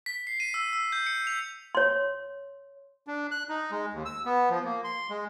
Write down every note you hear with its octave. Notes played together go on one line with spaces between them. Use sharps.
B6
C7
D#7
E6
E6
G6
C#7
F7
C#5 C6
D4
F#6
D#4
G#3
D#2
E6
B3
F3
A#3
C6
G#3